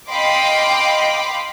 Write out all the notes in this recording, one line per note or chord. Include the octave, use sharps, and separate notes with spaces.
D#5 F5 G5 B5 C6 D6